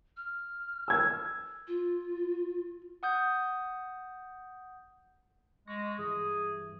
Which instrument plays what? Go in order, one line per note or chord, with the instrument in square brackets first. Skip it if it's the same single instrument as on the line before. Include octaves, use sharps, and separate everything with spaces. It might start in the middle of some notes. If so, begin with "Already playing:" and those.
[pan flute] F6
[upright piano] E6 G#6
[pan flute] F4
[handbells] F#5 D#6 G6
[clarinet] G#3 [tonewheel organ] C#6 A#6
[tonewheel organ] G2 E3 [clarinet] G#4